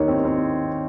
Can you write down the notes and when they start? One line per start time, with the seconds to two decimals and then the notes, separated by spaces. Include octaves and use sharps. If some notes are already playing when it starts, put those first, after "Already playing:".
Already playing: D#2 D#3 A#3 D#4 C#5
0.08 C4
0.25 C4